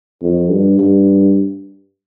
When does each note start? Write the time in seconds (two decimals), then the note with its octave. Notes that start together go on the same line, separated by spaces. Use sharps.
0.22 F2
0.51 G2
0.79 G2